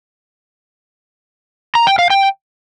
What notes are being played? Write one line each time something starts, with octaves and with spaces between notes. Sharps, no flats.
A#5
G5
F5
G5